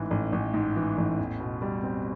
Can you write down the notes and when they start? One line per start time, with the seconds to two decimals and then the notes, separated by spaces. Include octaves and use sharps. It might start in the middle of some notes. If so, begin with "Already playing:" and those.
Already playing: A1 G#2 E3
0.11 A1
0.32 A1
0.54 G#2
0.76 E3
0.98 A1
1.19 E2
1.40 B2
1.62 G3
1.83 C4